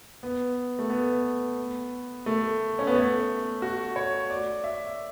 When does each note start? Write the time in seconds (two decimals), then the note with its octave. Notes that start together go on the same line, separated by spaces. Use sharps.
0.23 B3
0.79 A3
0.90 B3
2.26 A3
2.79 C#4
2.87 B3
2.95 A3
3.62 F#4
3.96 C#5
4.30 D5
4.64 E5